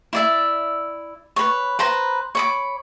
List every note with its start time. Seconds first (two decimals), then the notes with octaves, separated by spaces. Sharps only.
0.13 E4 D5 E5
1.36 B4 C#5
1.79 B4 C5 A#5
2.35 C#5 B5 D6